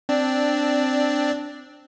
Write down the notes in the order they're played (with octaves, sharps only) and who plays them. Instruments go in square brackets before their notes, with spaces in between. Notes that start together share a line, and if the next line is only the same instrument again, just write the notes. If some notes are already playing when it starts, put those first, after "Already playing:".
[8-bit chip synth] C4 D4 D5